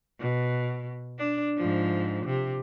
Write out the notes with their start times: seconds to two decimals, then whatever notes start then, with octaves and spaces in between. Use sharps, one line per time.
0.20 B2
1.18 D4
1.57 G#2 F3
2.26 C3